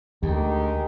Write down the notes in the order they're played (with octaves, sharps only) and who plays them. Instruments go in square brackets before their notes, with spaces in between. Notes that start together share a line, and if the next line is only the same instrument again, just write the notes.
[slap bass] D2 [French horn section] D#3 G#3 G4